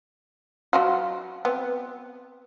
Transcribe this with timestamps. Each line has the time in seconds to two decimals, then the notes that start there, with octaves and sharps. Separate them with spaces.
0.73 F#3 F4 F#4
1.45 B3 C4